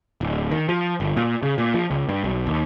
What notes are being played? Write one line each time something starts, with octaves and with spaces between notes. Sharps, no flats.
D1
D#3
F3
G1
A#2
C#3
A#2
F3
C#2
G2
B1
D#2